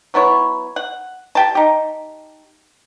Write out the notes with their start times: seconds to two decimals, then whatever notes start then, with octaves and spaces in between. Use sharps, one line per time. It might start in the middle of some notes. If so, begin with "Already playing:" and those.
0.14 F#3 B3 E4 C#5
0.76 F#5
1.35 G4 G5 A5
1.55 D#4 G4